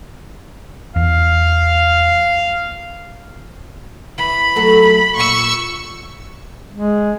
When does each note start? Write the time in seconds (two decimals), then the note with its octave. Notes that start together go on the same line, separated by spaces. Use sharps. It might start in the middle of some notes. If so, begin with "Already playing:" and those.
0.96 E2 F5
4.18 E3 B5
4.56 F#3 A3 A4
5.16 A#2 C#6 E6
6.73 G#3